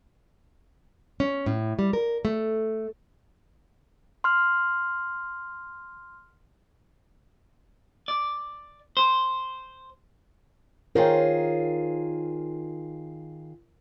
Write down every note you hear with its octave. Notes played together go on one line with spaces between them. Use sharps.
C#4
A2
G3
A#4
A3
C6 F6
D5
C5
D#3 F4 G#4 A#4 C5 C#5 G5